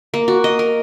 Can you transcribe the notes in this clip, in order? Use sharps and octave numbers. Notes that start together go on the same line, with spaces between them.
A#3
F#4
D#5
A#4